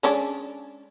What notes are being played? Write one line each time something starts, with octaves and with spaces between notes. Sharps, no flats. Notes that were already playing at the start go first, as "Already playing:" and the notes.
G#3 C#4 D4